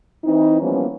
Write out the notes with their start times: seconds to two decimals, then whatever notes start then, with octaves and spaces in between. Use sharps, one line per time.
0.25 E3 C4 D#4
0.61 E3 F3 G3 A#3 B3 C#4